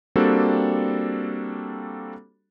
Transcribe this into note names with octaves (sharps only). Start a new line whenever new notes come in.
G3 A#3 C4 D4 F#4 A4